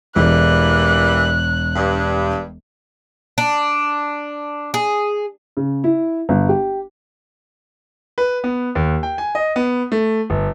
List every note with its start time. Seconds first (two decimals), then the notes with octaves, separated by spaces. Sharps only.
0.16 E1 E3 G3 A#3 F#6
1.75 G2
3.38 D4
4.74 G#4
5.57 C#3
5.84 E4
6.29 G1
6.49 G4
8.18 B4
8.44 B3
8.75 D#2
9.03 G5
9.18 G#5
9.35 D#5
9.56 B3
9.92 A3
10.30 G1